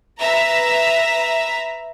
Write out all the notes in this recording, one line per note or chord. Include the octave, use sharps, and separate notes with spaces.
B4 E5 A#5